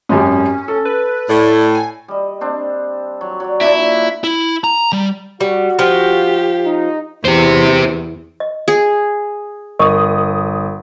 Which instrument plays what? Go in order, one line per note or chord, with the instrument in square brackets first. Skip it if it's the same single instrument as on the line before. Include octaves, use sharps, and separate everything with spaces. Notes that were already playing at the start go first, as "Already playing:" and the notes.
[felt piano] G#1 F#2 G4 [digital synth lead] C#4
[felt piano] A4
[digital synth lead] B4
[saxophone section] A2 [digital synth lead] D5
[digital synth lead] G#5
[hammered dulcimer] G3 D#5
C4 D4 C5
F#3
F#3 D5
[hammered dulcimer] A#2 D4 [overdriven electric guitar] E4
[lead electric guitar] E4
A#5
G3
[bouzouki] G3 [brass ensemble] F#4
[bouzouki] F3 [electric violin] G4
[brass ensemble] D#4
[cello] E2 [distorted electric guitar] G4 C5
[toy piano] D#5
[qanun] G#4
[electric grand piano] G1 D#6 [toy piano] A#4 D#5 C#6